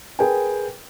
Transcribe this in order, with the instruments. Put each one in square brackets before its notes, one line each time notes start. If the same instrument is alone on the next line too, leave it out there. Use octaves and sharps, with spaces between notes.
[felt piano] G#4 A#4 B4 G5 G#5